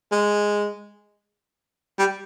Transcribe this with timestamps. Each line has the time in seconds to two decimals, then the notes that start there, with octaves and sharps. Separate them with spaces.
0.12 G#3
1.99 G3